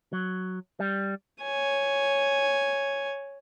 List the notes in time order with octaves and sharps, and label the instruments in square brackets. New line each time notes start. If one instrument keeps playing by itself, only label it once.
[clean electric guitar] F#3
G3
[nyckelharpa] C#5 G#5